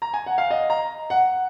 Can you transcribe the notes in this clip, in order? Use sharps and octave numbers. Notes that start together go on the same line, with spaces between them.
A#5
G#5
F#5
F5
D#5
A#5
F#5